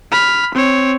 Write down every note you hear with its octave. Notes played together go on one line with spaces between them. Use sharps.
B5 F6
C4 C#5